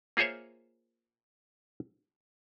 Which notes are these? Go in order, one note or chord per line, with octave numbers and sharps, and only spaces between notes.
A#3 F4 G#4 C5 C#5 E5